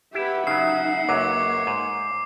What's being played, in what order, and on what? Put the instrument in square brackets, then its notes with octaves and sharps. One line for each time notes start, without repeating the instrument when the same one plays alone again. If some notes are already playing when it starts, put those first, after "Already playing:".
[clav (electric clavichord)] E4 [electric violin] G4 B4 [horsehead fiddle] E5 F#5
[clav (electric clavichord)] C#3 F#3 [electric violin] D#4 [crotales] C7
[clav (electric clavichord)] C#2 F#2 F#3 [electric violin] A#3 C#5 [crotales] D6
[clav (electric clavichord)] G#2